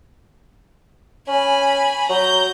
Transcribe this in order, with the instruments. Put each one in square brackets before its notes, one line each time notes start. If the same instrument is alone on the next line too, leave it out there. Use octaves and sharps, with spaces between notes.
[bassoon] C#4 [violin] G#5 B5
[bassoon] F#3 [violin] A#5 G6